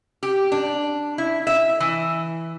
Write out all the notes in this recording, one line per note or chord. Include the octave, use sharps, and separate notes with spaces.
G4
D4
E4
E5
E3